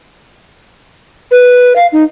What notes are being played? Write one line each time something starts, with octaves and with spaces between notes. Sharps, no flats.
B4
F5
D#4